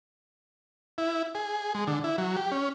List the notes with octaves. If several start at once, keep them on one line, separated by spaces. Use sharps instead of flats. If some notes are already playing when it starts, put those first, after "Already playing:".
E4
G#4
G#3
D3
E4
F#3
G4
C#4